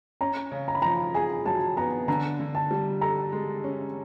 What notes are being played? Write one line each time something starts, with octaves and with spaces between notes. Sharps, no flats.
C#4 A#5
C#3
A#5
B5
F3 A#5
G#4 G#5
F#3 A5
B3 A#5
D3 A#5
D3
A5
G3
A4 A#5
G#3
C#4